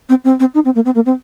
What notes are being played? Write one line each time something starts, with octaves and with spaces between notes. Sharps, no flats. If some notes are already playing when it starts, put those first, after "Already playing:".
C4
C4
C4
D#4
C4
A#3
C4
A#3
C4